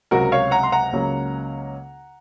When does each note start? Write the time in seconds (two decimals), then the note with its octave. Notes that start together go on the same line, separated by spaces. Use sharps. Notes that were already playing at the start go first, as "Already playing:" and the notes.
0.11 C#2 C3 F#3 F#4 A#4
0.32 C#5 F5
0.51 F#5 A#5
0.63 C6
0.72 F#5 A#5
0.93 C#2 C#3 F#3 A#3 C#4